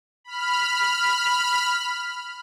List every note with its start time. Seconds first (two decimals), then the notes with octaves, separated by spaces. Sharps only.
0.24 B5 F6